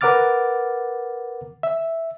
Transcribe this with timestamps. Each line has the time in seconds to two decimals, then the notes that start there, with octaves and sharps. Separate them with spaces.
0.01 A#4 B4 F#5 D6 F6 A6
1.63 E5